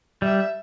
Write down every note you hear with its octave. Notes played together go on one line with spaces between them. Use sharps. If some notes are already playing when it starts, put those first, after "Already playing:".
G3 E5